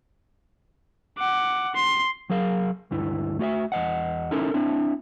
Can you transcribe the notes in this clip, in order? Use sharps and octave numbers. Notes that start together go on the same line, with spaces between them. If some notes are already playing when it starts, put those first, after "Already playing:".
F#5 D6
C6
F#3 G#4 A#4 F5
D2 G2 E4
A3 F#4 D#5 E5
E2 D#5 F#5
C#4 D#4 E4 A4 A#4
C4 D4 E4